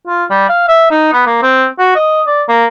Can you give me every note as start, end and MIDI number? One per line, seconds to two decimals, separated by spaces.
0.08 0.25 65
0.30 0.46 55
0.49 0.64 77
0.68 0.90 76
0.91 1.12 63
1.13 1.22 59
1.27 1.42 58
1.43 1.66 60
1.79 1.91 66
1.96 2.21 75
2.27 2.43 74
2.48 2.66 58